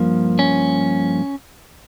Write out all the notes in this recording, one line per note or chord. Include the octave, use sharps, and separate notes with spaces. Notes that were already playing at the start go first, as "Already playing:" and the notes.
Already playing: G2 F3 A#3
C#4